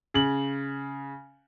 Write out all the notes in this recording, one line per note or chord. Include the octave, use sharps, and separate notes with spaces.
C#3 F#7